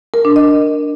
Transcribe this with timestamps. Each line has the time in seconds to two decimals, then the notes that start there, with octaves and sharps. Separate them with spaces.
0.14 A#4
0.25 D4
0.36 D#5